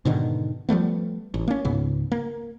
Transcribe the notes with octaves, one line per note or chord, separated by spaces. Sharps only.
G#2 B2 D3 D#3
F3 G3 A3 B3
A1
A#3 C#4
C#2 G#2 C#3 B3
A#3